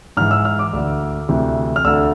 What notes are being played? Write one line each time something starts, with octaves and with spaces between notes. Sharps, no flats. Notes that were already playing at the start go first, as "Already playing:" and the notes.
G#2 E3 F6
E6
F6
D6
D2 D3
D2 C3 E3
F6
D2 D3 E6